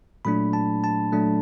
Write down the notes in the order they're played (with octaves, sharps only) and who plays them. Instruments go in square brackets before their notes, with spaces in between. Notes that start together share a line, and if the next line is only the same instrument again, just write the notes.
[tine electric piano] A#2 F#3 A3 D4 B5
A5
A5
A#2 F#3 A3 D4